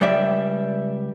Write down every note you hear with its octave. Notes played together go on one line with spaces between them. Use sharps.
C#2 G3 D5 E5